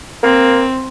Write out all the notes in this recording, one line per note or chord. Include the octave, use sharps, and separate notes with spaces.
A#3 C4